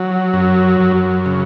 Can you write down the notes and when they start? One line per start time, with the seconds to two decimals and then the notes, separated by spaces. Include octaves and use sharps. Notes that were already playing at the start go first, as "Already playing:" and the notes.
Already playing: F#3
0.33 F#2
0.80 F#2
1.26 C#3